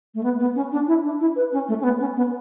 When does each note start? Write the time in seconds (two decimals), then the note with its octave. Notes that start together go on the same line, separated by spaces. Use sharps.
0.15 A3
0.23 B3
0.39 B3
0.55 C#4
0.72 D4
0.88 E4
1.04 D4
1.20 E4
1.36 B4
1.52 C#4
1.68 A3
1.80 C#4
1.84 B3
2.00 C#4
2.16 B3